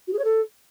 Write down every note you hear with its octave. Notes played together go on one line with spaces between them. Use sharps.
F#4
G#4
C#5
A4